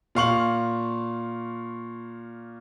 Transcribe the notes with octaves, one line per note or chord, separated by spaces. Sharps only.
A#2 F5 C#6 F#7